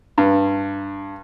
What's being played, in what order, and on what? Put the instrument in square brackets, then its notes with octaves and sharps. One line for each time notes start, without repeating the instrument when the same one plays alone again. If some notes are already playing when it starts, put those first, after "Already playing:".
[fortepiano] G2